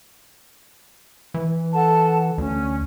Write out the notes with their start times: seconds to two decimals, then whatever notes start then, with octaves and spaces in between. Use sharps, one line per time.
1.34 E3
1.73 A4 F#5 A5
2.38 D2 C#4